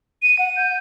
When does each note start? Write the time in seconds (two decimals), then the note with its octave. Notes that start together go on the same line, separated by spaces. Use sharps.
0.23 D#7
0.39 F#5
0.56 G6